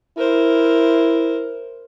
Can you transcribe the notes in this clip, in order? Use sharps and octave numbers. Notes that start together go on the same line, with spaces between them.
E4 A#4 C5